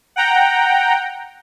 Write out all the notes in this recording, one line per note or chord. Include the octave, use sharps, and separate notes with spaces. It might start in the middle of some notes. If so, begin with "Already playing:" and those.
F#5 G5 A#5